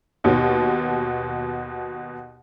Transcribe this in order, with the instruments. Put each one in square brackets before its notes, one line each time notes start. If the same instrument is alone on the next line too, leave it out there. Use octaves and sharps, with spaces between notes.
[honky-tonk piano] D#2 B2